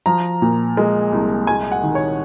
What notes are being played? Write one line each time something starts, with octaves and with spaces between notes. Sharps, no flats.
F3 A#5
A#2
G#3
C2
G#3 G#5
F#5
D#3
C#5